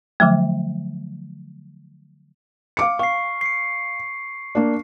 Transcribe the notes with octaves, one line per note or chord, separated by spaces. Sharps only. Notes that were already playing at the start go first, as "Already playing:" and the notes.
D3 F3 F#3 A3
F5 D6 C#7
F5 C#6 C7
C7 C#7
A#3 D4